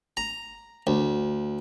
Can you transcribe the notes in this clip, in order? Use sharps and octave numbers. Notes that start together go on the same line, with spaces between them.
A#5
D2